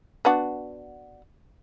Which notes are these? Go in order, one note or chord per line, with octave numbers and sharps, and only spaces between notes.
B3 D4 F#4